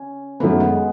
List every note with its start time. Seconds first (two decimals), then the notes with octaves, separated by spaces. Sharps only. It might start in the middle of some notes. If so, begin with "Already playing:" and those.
Already playing: C#4
0.40 F#2 D#3 A3 B3 E4 B4
0.60 G#3